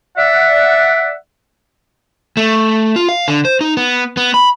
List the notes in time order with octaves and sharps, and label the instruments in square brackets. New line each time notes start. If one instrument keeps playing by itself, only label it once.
[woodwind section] D5 E5 F#5
[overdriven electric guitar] A3
F4
F5
D3
C5
D#4
B3
B3
B5